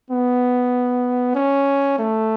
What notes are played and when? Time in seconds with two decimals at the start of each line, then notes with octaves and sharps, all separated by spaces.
0.10 B3
1.35 C#4
1.99 A3